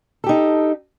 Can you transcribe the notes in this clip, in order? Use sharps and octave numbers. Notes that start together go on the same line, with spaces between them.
D#4 G4 A4